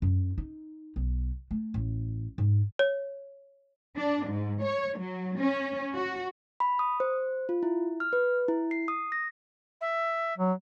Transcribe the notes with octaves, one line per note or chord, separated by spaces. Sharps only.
F#2
D#4
B1
A3
A1
G#2
C#5
D4
G#2
C#5
F#3
C#4
F#4
B5
D#6
C5
F4
E4
F6
B4
E4
C7
D#6
A#6
E5
F#3